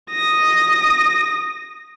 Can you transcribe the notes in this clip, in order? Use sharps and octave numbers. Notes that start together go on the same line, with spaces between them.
D#6 A#6